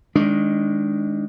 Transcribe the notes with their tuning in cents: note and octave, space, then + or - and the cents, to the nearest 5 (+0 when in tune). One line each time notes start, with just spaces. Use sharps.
D#3 +0 G#3 +5 D4 -20